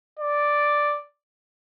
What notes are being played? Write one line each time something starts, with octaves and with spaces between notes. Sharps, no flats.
D5